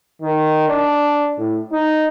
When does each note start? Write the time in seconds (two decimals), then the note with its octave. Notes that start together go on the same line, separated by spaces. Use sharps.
0.22 D#3
0.69 D4
1.38 A2
1.73 D#4